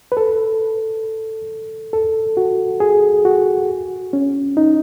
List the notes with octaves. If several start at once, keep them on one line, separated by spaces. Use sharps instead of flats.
B4
A4
A4
F#4
G#4
F#4
C#4
D#4